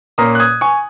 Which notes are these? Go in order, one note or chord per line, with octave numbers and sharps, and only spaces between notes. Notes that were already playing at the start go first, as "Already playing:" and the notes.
A#2 A#3 C#4 A#5 D#6
F#6
D#6 G#6
G#5 C#6